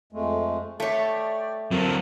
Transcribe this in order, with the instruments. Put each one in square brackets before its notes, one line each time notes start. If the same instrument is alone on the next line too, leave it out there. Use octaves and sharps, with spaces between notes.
[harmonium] F2 G#3 A3
[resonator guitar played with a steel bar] A3 C#5 [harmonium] D5 G5
[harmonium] D3 A#4 A5 [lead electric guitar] F#3 C4